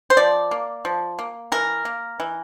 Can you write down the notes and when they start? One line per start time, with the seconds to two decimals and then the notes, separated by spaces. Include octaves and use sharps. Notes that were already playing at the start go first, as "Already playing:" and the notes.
0.10 C5
0.17 F3 D5
0.51 A#3
0.85 F3
1.19 A#3
1.52 E3 A#4
1.85 A#3
2.20 E3